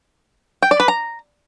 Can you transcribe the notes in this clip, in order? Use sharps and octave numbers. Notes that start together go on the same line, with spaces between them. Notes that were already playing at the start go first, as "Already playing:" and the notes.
G5
D5
B4
A#5